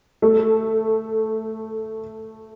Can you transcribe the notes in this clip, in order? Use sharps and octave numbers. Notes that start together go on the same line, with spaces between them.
A3 A4